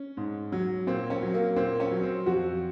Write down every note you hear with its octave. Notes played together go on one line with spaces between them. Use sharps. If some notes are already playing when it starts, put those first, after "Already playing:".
Already playing: C#4
G#2
F#3
A#2 C4
C#4
F#3
A#3
A#2 C4
C#4
F#3
C4
F2 F#4